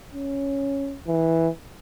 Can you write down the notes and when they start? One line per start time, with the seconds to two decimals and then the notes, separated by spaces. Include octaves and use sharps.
0.14 C#4
1.07 E3